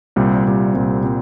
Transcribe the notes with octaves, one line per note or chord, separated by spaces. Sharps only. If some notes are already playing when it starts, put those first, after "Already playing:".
C2 A#2 G3 C4
C2 A#2 G3 C4
C2 A#2 G3 C4
A#2 G3 C4